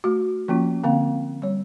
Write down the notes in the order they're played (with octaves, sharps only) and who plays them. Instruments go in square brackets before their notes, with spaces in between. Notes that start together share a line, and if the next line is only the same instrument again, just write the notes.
[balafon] A3 F#4
F3 A#3 C#4 F4
D3 A#3 C4 F5
G3 C#5